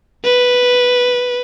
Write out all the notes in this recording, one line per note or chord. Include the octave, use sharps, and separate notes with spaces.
B4